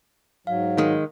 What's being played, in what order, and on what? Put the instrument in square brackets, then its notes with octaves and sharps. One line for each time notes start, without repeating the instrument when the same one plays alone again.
[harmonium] G#2 F#3 [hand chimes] F5
[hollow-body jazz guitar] D#3 G#3